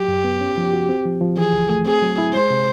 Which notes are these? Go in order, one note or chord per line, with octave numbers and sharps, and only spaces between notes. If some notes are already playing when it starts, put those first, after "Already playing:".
Already playing: F#3 G4
F#2
B3
C#4
F3
F#4
C4
F3
F3
E3 G#4
C#2
A3
C4 G#4
F#3
E4
G#3 C5
C3